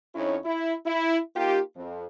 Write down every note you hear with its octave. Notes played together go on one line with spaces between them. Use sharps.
F2 C#4 D#4 E4 C#5
E4
E4
A#3 D#4 F4 G4
F2